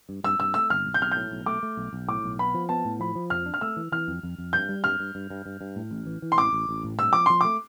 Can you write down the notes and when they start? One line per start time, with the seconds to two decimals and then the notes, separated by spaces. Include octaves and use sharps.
0.09 G2
0.24 G2 E6
0.39 G2 E6
0.54 A3 E6
0.70 G1 F6
0.85 B1
0.94 G6
1.01 B1 F6
1.12 A2 G6
1.31 B1
1.46 A3 D6
1.63 A3
1.77 B1
1.93 B1
2.08 A2 D6
2.24 B1
2.39 B3 B5
2.54 F3
2.69 B3 A5
2.85 A2
3.00 F3 B5
3.15 F3
3.30 F2 F6
3.46 D4
3.54 F6
3.61 A3 E6
3.77 E3
3.92 E3 F6
4.08 F2
4.23 F2
4.38 F2
4.53 G2 G6
4.69 G3
4.84 G2 F6
4.99 G2
5.15 G2
5.30 G2
5.46 G2
5.61 G2
5.76 A2
5.91 A1
6.06 E3
6.22 E3
6.32 C6
6.38 A1 D6
6.53 A1
6.69 A1
6.84 A2
6.99 G2 E6
7.13 F3 D6
7.26 F3 C6
7.41 A3 D6